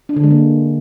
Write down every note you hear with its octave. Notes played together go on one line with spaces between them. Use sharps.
D4
D3
G#3
A#3